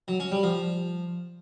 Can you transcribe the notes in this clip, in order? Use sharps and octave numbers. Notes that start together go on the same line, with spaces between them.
F#3
C#4
G3
F3